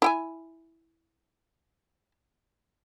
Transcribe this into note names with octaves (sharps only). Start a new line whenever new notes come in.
E4 G5 G#5